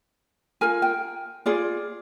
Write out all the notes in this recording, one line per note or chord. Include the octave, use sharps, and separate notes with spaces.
F4 A#4 G#5
G5
F4 G#4 D5